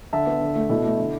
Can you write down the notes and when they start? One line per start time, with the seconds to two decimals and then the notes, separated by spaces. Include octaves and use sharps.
0.13 D3 E5 A5
0.27 B3
0.41 D3
0.55 A3
0.69 B2 E4 A4
0.84 A3
0.98 D3